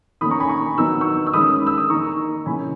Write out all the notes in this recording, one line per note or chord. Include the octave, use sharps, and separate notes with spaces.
D#3 A#3 C#4 B5 D#6
A#5 C#6
G#5 B5
A#5 C#6
D#3 F#3 B3 D#4 E6
C#6 E6
E6
D#3 G#3 C#4 B5 D#6
E6
D#6
D#3 A#3 D#4 A#5 C#6
C#3 E3 A#3 C#4 G#5 B5